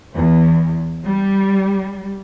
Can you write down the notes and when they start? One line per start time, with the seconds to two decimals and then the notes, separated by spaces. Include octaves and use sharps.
0.14 E2
1.05 G3